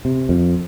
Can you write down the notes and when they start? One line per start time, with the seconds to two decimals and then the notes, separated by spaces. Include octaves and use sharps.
0.05 C3
0.29 F2